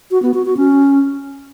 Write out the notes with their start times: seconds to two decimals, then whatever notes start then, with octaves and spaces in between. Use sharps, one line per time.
0.11 F#4
0.22 B3
0.34 F#4
0.45 F#4
0.57 C#4